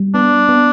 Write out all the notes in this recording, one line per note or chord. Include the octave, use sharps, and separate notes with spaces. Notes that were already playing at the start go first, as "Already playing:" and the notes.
Already playing: G3
B3 D4
B3